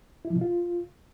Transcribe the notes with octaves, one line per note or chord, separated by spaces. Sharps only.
E4
F3
B2
F4